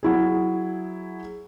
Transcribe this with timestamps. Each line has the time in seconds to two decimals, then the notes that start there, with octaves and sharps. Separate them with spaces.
0.03 F#3 E4 G#4